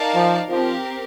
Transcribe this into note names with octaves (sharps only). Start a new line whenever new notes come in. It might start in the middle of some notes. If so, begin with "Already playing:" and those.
Already playing: D#4 A#4 D5 F5 A5
F3
F3 C4 G4 A#4